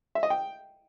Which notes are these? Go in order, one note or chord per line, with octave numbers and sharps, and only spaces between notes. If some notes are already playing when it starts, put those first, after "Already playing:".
E5
D#5
G5